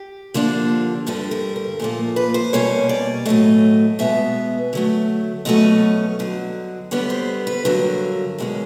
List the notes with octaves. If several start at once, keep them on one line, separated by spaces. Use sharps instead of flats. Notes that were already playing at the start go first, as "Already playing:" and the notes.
Already playing: G4
D3 F3 A#3 D4
G2 D3 G3 A4
A#4
A#4
A#2 F3 A#3 A4
B4
C5
B2 G3 A#3 C#4 C#5
D5
A2 F#3 A3 D#5
B2 G#3 B3 E5
D3 F#3 A3
B2 F#3 A3 C#4 D#5
G2 D3 F#3
D3 G3 B3 C#5
C5
B4
G2 D3 F#3 A#4
E2 B2 G#3 C#4